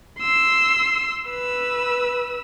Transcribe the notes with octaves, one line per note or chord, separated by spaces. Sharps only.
C6 E6
B4 E6